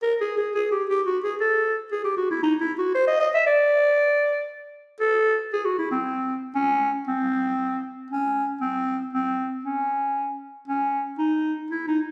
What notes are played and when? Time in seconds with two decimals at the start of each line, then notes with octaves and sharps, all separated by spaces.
0.03 A#4
0.21 G#4
0.38 G#4
0.55 G#4
0.72 G4
0.89 G4
1.06 F#4
1.23 G#4
1.41 A4
1.92 G#4
2.05 G4
2.17 F#4
2.31 E4
2.43 D#4
2.61 E4
2.78 F#4
2.95 C5
3.07 D#5
3.20 D#5
3.34 E5
3.47 D5
5.00 A4
5.53 G#4
5.65 F#4
5.78 E4
5.91 C4
6.55 C#4
7.08 C4
8.11 C#4
8.61 C4
9.13 C4
9.65 C#4
10.68 C#4
11.18 D#4
11.71 E4
11.88 D#4